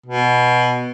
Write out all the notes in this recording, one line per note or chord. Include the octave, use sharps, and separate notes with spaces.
B2